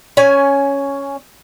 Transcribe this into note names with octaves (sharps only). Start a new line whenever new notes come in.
C#4 G#5